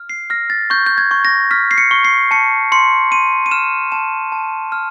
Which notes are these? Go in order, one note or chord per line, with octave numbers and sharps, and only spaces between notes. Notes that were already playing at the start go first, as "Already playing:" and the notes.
Already playing: F6
C7
F6 A#6
A6
C#6 G6
G6
G#6
C#6
A#6
F6 B6
C7
C#7
C#6
C7
A5 C#7
C6 C#7
C6 D#7
D#7
F6 E7
A5 E7
A5
F6